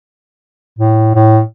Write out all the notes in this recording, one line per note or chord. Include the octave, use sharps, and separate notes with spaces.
A2
A2